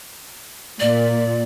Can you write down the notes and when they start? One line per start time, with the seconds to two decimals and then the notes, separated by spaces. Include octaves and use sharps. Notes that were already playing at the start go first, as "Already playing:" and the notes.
0.80 A#2 D5